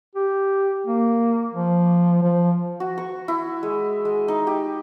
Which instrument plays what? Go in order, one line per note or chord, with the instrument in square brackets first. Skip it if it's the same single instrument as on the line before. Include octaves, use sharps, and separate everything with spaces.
[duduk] G4
A#3
F3
F3
[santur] F#4
C#6
E4
G#3
G#3
D#4
G4